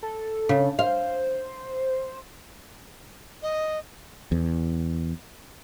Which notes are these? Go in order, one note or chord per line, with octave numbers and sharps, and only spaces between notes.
A4
C#3
C5 F5
D#5
E2